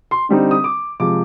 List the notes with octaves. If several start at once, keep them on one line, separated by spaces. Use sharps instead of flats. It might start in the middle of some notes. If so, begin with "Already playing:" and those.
C6
D3 G3 C4 D#4
D#6
D6
C3 F3 G#3 D6